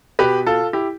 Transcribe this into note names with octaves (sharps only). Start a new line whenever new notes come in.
B2 G4 B4
F4 A4
E4 G4